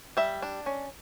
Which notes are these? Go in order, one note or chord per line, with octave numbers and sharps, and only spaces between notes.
G3 E5
D4
C#4